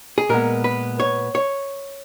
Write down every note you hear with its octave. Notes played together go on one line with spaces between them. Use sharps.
G#4
A#2 G#3 B3 A#4
B4
C#5
C#5